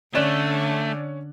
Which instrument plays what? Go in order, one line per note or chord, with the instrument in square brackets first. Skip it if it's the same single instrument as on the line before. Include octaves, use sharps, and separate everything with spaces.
[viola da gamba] D3 [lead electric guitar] A3 [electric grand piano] C#4 C#5 E7 [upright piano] D5 F#6